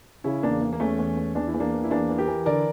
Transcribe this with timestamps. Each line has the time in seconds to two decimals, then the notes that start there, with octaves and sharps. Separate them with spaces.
0.24 C#3 C#4 E4
0.43 E2 A#3 D4
0.61 E2 A#3
0.73 A#3
0.80 E2 A3 C#4
0.99 E2
1.17 E2
1.35 E2 D4
1.47 E4
1.54 E2
1.60 A#3 D4
1.73 E3
1.84 E4
1.91 E2 A#3 D4
2.09 E3
2.18 G4 A#4
2.28 E3
2.46 D3 A#4 D5